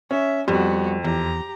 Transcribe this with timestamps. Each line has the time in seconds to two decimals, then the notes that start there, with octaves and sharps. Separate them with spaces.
0.11 C#4 E5
0.48 F2 G3 B3 F#4
1.04 E2 G4 A#5